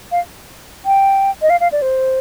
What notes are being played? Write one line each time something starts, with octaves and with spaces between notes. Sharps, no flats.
F5
G5
D#5
F5
F5
D5
C5